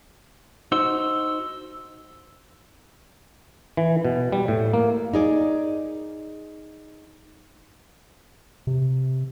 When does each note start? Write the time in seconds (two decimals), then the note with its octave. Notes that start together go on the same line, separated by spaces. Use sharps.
0.72 D#4 F#4 C5 E6
3.77 E3
4.05 B2
4.32 G3
4.48 A2
4.74 A#3
5.14 D#4 G#4 D5
8.67 C3